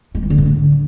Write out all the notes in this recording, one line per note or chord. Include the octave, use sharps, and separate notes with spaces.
G#3
E3
D3
A2
D3